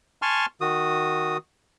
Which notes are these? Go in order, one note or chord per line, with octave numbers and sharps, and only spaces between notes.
G#5 A5 C6 C#6 F6
D#3 F#4 D#6